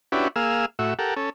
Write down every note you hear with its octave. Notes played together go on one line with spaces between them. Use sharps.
C#4 D4 E4 F#4 G4 B4
A#3 G#4 F5 E6
A2 F#4 E5
G4 A4 A#4 F#5
C#4 A4